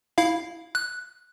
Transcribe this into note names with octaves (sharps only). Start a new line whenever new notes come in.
E4 F5
F#6